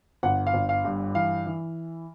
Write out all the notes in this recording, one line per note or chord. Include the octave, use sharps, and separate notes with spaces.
G1 F#5
F5
G1
F5
G2
E3 F5
E3